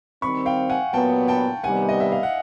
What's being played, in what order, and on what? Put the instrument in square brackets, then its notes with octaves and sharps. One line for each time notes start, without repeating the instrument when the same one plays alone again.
[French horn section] D#3 G3 C4 [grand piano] B5 C#6
[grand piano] F5 G5
F#5 G#5
[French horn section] A#2 F#3 B3 [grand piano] G5 A5
[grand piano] G5 A5
[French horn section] C3 D#3 G3 B3 [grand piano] F#5 G#5
[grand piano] D#5
E5
F5
F#5